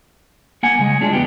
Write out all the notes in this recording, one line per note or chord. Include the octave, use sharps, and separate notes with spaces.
A#3 F#5 G#5
C#3 G#3
G#3 D4 F4 G#4
E2 B3 G4